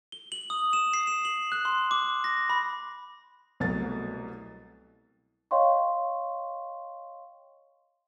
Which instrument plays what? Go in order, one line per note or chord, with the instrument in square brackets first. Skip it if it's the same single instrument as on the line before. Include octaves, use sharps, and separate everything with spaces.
[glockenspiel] G7
F#7
D#6
E7
C7
E7
F#7
F#6
C6
D6
A#6
B5
[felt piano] C2 B2 F#3 A3 A6
[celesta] C#5 D#5 F5 G5 C6 C#6